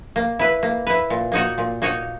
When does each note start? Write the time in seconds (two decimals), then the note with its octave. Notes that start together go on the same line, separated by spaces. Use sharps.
0.16 A#3
0.39 E4 B4
0.63 A#3
0.87 E4 B4
1.10 A#2
1.32 A#3 D#4 F#4 C#5
1.58 A#2
1.82 A#3 D#4 F#4 C#5